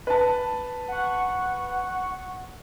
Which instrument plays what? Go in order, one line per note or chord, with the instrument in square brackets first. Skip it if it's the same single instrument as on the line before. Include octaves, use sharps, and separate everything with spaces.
[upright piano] B4 A5
[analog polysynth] F#5 C#6